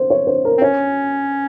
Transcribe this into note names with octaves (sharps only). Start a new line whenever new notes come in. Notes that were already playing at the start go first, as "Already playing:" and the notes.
Already playing: C5
C#5
C5
A#4
C4
C#4 C#5